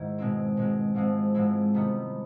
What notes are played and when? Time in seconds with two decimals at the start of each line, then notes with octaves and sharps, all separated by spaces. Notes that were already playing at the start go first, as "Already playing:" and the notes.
Already playing: G#2 D#3 E4
0.18 B2 G#3 C4
0.57 B2 G#3 C4
0.94 G#2 F3 G#3 C4 E4
1.34 G#2 F3 G#3 C4 E4
1.74 C3 D#3 G3 B3